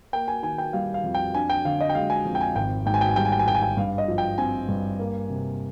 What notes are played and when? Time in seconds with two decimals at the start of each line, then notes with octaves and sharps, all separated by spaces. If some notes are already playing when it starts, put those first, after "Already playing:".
0.13 A#3 G5
0.28 G#5
0.43 D#3 G#5
0.58 G5
0.73 G3 F5
0.94 F5
1.03 F2
1.15 G5
1.34 D4 G#5
1.50 G5
1.65 D3 F5
1.81 D#5
1.89 G5
1.95 G#3 F5
2.10 G#5
2.25 F2
2.35 G5
2.41 G#5
2.55 G#1 G5
2.86 G#2 G5
2.94 G#5
3.01 G5
3.09 G#5
3.16 G3 G5
3.25 G#5
3.32 G5
3.39 G#5
3.47 G#1 G5
3.55 G#5
3.63 G5
3.77 G2 F5
3.98 D#5
4.08 F3
4.18 G5
4.38 C4 G#5
4.68 G2
4.99 A#3
5.30 C3